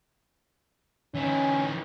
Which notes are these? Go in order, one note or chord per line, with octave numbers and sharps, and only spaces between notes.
E3 C#4 D#4